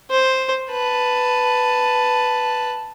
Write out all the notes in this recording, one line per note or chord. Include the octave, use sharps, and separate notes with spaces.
C5
B4 A5